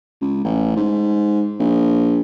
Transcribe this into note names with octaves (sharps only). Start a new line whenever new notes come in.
C#2
A1
G#2
A#1